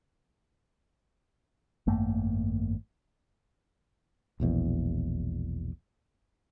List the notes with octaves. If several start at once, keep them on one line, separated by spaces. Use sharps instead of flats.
G#1 F#2 A3 A#3
E1 A#1 E2